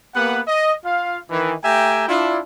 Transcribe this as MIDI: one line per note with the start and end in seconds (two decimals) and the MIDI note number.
0.15 0.41 58
0.15 0.41 59
0.15 0.41 67
0.15 0.41 71
0.15 0.41 78
0.47 0.74 75
0.84 1.19 65
0.84 1.19 77
1.30 1.55 51
1.30 1.55 52
1.64 2.05 57
1.64 2.05 67
1.64 2.05 76
1.64 2.05 79
1.64 2.05 80
1.64 2.05 82
2.08 2.39 62
2.08 2.39 64
2.08 2.39 65